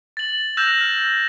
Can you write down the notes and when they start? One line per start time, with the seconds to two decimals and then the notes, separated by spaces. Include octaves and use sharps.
0.17 A6 F#7
0.57 E6 F#6 G6 A#6 E7 F7
0.81 F6